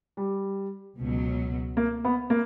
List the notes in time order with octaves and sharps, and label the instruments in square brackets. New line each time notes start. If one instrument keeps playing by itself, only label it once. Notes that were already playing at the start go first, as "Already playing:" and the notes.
[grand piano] G3
[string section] C#2 B2 F#3
[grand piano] A#3
B3
A#3